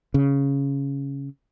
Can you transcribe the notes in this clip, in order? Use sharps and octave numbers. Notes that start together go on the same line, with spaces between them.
C#3